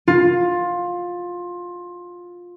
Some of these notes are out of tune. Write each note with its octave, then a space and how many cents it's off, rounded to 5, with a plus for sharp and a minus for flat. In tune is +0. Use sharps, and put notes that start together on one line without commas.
F4 +15